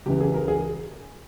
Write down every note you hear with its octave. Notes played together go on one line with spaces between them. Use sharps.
C#2 C#3 E3 G4
G#4
A#4
G#4